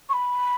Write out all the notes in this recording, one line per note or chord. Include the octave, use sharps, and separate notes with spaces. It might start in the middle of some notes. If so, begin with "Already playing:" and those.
C#6
B5